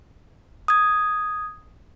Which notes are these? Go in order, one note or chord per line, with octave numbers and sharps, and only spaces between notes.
D#6 G#6